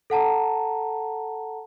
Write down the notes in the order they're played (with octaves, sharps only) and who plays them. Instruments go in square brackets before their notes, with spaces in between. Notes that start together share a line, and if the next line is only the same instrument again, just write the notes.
[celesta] A4 F#5 A5 A#5